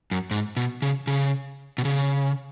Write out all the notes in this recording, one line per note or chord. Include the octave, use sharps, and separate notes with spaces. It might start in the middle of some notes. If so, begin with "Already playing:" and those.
F#2
G#2
B2
C#3
C#3
B2
C#3